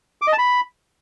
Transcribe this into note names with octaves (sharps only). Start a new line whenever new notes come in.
D6
D#5
A5
B5